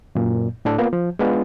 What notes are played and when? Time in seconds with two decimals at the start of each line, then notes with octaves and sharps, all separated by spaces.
0.15 F#2 A#2
0.65 A2 D4 A4
0.78 A#3 B3 F4
0.93 F3
1.19 G#3 B3 D4 F4